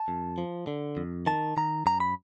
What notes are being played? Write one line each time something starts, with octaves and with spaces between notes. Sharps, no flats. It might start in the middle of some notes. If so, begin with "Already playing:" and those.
Already playing: A5
F2
F3
D3
F2
D#3 A5
D#3 A#5
F#2 A#5
B5